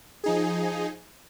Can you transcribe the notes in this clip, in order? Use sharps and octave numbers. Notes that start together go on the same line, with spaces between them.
F3 D#4 G#4